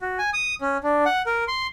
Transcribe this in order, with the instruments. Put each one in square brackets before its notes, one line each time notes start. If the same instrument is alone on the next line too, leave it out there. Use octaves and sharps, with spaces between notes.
[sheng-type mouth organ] F#4
G#5
D#6
C#4
D4
F#5
A#4
C6